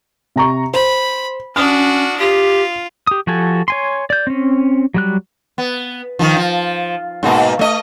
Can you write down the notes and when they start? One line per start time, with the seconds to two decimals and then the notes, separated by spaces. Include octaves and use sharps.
0.36 C3 A#5 C#6
0.74 C5 B5
1.56 C#4 D4 F#4 D#6 F6
2.20 F4 G4
3.07 G4 D#6
3.27 F3 F#4 G4 A4 G#5
3.68 C#5 G#5 C6
4.10 D5 G6
4.27 C4 C#4
4.94 F#3 G3 F#6
5.58 B3
6.19 D#3 F3
6.37 F3
7.23 G#2 B2 A#3
7.59 A3 D#5